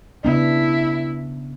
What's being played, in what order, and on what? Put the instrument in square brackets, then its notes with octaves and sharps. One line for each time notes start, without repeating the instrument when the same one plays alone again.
[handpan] C#3 B3 D4 [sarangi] E4